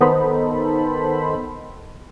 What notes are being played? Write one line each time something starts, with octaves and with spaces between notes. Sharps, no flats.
D#3 B3 D#4 A4 C5 B5